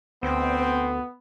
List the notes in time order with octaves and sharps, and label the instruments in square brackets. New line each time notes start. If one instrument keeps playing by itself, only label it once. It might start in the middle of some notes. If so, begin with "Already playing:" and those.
[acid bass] D2 [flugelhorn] B3 [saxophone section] C4